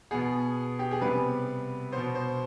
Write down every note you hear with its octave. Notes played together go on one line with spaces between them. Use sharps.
B2 B3 G#4
G4
G#4
C3 G3 B3 B4
B3 C5
B2
C5